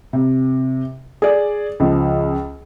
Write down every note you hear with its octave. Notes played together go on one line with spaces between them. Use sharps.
C3
G#4 D5
C#2 F3